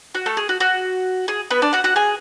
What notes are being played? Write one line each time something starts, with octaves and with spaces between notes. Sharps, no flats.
F#4
A3 A4
G#4
F#4
F#4
G#4
B3 B4
D4 D5
F#4 F#5
F#4 F#5
G#4 G#5